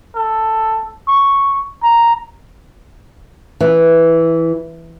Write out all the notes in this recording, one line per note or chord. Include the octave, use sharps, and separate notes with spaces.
A4
C#6
A#5
E3